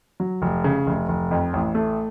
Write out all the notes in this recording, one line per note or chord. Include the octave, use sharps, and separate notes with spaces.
F#3
F1
C#3
F1
F1
F2
A1
A3